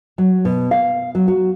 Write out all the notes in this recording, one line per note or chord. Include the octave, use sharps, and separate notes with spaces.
F#3
B2
F5
F#3
F#4